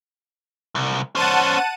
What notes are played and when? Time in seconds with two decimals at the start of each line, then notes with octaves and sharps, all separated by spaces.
0.75 C2
1.15 C#4 C5 F#5 A5 D#7